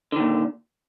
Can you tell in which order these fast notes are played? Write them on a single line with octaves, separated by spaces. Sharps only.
D3 D#3 A#2